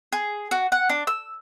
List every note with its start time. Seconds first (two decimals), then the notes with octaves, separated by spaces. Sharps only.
0.13 G#4
0.51 F#4
0.72 F#5
0.89 D4
1.07 E6